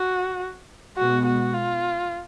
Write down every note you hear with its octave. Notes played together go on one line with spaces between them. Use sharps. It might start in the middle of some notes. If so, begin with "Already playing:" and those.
Already playing: F#4
B2 G#3 B3 F#4
F#4
F4